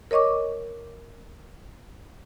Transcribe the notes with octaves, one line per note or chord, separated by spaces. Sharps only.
A#4 C#5 D#5 C#6 D6